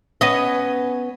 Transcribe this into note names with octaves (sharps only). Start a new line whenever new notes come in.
B3 C#4 D#5